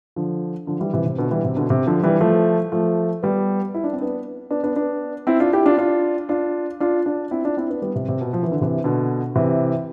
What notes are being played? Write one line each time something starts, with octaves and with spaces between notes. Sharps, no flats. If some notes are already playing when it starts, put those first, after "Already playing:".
D3 F3
D3 F3
E3 G3
C3 E3
C3
B2 D3
E3 G3
C3
B2 D3
C3
D3 F3
E3 G3
F3 A3
F3 A3
G3 B3
E4
D4
C4
B3 D4
B3 D4
B3 D4
B3 D4
C4 E4
D4 F4
E4 G4
D4 F4
D4 F4
D4 F4
D4 F4
D4 F4
C4 E4
D4 F4
C4 E4
B3 D4
G3 B3
C3
C3
B2
F3
E3
D3
C3 E3
B2 D3
C3 E3